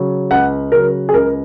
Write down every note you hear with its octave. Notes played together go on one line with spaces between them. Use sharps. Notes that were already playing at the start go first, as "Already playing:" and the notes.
Already playing: C#3 F#3
C#2 F#5
C#3 F#3 A#4
G#4
C#2 A#4